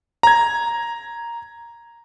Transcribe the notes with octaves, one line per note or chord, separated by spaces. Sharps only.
A#5 G#6